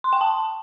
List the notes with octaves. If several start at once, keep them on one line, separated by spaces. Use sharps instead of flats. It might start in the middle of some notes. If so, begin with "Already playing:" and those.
C6
G5
A5